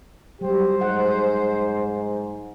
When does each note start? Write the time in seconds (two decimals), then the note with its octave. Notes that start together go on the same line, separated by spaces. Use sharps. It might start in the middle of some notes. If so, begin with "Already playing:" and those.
0.41 F#3 G3 G4 C5
0.80 G#2 G#4 F#5